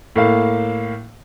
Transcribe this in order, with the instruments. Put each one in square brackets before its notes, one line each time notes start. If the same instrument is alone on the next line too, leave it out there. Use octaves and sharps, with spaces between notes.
[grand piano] A2 A#3 F5